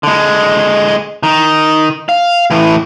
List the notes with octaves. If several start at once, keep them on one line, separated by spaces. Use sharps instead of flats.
D3 G#3
D#3
F5
A2 E3